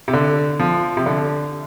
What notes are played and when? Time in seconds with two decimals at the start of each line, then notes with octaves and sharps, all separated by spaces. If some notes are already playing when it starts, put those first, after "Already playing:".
0.08 C3
0.13 D3
0.59 F3
0.97 C3
1.06 D3